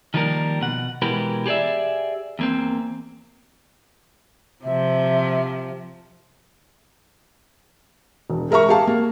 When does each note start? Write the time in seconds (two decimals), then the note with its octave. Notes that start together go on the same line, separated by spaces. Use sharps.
0.14 D#3 F3 G3 A#3 A#4
0.61 B2 F#5
1.02 B2 E3 G#3 G4 A#4 B4
1.46 G4 G#4 C5 D5 E5
2.39 E2 A#3 C4
4.64 C3 F3 E5
8.30 E1
8.51 G#3 A#4 E5 A#5 C#6
8.69 G4 G#4 F5 A5
8.87 A#3